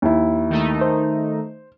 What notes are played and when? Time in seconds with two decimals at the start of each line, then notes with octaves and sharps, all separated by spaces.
0.02 D#2 E4
0.50 D#3 A3 D#4
0.81 C5